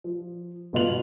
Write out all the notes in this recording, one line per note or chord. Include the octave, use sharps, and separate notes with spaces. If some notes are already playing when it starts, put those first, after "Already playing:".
F3
G1 B2 F4 B4 F7 F#7